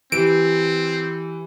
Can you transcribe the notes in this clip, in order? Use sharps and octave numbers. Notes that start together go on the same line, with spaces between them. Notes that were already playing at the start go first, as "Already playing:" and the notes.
E3 C4 G4 D7